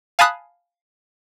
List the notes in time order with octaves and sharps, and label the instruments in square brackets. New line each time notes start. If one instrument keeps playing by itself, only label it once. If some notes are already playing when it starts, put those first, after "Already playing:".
[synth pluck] F5 G#5 A5 B5 D#6 F#6